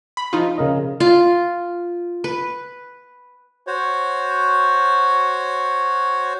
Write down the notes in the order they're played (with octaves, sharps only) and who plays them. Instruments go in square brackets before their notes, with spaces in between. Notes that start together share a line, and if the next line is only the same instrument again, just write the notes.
[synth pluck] B5
F3 D#4 F4
[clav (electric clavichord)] C#3 A#4 D#5
[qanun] F4
B4
[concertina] F#4 C5 C#5